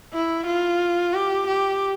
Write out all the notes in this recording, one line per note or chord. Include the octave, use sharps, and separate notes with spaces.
E4
F4
G4
G4